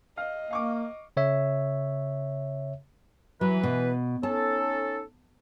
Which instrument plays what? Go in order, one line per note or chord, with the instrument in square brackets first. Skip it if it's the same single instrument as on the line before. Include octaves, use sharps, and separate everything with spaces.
[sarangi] D#5 [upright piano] F5 F6
[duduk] A#3 [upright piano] F5 C#6 D6
[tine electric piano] C#3 C#5 E5
[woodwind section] E3 B4 [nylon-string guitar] F#3
[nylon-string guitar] B2
[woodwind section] C#4 D#4 A4 [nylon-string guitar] A5